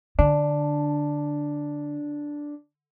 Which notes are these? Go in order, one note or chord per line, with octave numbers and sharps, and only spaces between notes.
D3 D4